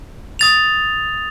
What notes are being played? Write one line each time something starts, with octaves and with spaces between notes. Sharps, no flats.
D#6 A6 F7